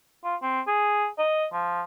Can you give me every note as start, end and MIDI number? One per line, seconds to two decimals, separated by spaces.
0.24 0.36 65
0.42 0.61 60
0.67 1.07 68
1.18 1.47 75
1.53 1.83 53